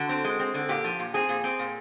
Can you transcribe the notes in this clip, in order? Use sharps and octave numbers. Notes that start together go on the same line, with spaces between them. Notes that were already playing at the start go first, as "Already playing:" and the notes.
Already playing: D3 F#4
C4
G#3
C4
D3
A#2 G4
F3
A#2
C4 G#4
A#2
C4
A#2